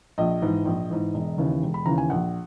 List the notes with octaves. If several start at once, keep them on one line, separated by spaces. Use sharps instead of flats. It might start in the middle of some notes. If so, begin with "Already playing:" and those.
A#1 D#5
G#2 E3
A#1
G#2 E3
E1
D#2 C#3 E3
E1
B5
D#2 C#3 E3 A#5
G#5
A#1 F#5